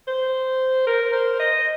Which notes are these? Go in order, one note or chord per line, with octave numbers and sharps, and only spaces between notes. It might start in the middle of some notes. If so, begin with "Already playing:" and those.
C5
A#4
C5
D#5